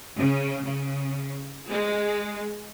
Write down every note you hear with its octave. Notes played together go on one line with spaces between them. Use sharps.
C#3
C#3
G#3